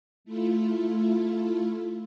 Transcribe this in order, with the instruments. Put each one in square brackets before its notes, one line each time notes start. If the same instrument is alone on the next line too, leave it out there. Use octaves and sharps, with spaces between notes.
[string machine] A3 E4 F4